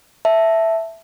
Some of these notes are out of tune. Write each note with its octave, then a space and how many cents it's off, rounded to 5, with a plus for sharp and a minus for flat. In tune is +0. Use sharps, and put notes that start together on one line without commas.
E5 +0 A5 +0